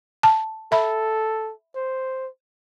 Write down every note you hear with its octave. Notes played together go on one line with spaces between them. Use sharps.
A5
A4 E5 B5
C5